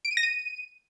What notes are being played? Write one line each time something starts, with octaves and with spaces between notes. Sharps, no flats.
D7
D#7
A#6
D#7